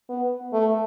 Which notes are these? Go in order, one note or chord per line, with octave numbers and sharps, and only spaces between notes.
B3
A3